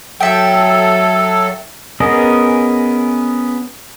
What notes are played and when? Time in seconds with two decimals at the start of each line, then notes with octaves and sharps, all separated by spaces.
0.20 F#3 A4 E5 G5
2.00 B3 C#4 G#4 A#4 D#5